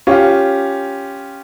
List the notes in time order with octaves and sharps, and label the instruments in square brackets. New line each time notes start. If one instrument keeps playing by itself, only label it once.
[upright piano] C#4 F4 G4